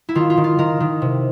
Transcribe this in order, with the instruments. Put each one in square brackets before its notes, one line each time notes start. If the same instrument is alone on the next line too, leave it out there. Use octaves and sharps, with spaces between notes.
[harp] E4
D#3 F4
F4
D#3
F4
D#3 A#4
D#3
C3